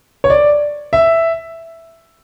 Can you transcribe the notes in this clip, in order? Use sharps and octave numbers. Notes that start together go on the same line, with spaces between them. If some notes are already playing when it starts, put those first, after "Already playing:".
C#5
D5
E5